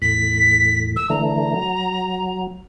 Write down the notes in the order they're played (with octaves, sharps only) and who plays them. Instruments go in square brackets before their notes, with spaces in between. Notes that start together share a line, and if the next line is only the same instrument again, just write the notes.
[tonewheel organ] E2 A2 [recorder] B6
[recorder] E6
[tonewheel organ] D3 E3 A3 [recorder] A#5
[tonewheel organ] F#3